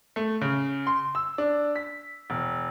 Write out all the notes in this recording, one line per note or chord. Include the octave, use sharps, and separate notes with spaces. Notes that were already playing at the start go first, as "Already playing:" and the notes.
A3
C#3
C6
E6
D4
B6
E1